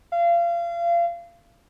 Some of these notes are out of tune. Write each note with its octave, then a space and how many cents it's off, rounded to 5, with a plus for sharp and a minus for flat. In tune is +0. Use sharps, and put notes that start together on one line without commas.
F5 -30